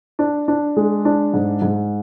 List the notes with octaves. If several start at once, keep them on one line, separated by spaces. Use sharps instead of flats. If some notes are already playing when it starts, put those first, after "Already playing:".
D4
D4
G#3
D4
G#2
G#2